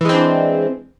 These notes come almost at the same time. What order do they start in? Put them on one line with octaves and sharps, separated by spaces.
E3 G#3 C4 D4